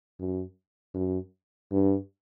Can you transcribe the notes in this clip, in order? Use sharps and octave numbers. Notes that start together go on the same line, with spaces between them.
F#2
F#2
G2